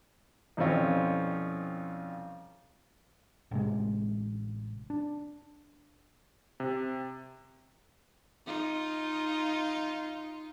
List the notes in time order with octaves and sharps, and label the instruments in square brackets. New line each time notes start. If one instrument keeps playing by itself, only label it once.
[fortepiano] C2 F2 B2 C4 C#4 F4
[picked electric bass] A1 C3 G#3
D4
[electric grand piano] C3
[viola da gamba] D#4 F4